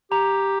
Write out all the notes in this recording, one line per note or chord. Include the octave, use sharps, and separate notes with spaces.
G4 A#5